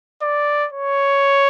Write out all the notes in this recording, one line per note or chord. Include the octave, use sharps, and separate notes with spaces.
D5
C#5